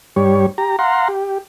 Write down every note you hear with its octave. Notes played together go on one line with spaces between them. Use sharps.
G2 G3 C#5
G4 A#5
F5 F#5 A#5 C6
G4